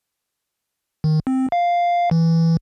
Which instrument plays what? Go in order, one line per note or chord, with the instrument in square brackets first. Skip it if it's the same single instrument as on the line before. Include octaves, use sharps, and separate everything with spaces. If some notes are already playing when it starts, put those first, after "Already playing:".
[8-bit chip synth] D#3
C4
F5
E3